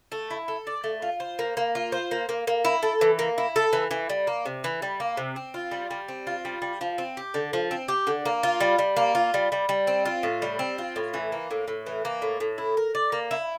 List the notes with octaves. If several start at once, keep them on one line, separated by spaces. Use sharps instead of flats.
A3
E4
A4
D5
A3
F4
C5
A#3
A#3
F4
C5
A#3
A#3
A#3
E4
A4
E3
A#3
E4
A4
E3
E3
G3
A#3
C3
E3
G3
A#3
C3
C4
F4
G3
G3
C4
F4
G3
G3
F3
C4
G4
D3
F3
C4
G4
D3
A#3
F4
G3
G3
A#3
F4
G3
G3
G3
C4
F4
A2
G3
C4
F4
A2
E3
A#3
A2
A2
E3
A#3
A2
A2
E4
A#4
D5
A#3
E4